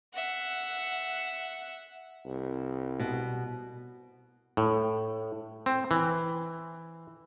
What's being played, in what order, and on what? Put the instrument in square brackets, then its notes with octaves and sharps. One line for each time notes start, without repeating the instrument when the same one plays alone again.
[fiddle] E5 F#5
[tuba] C2
[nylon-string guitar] B2
[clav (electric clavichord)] A2
C4
E3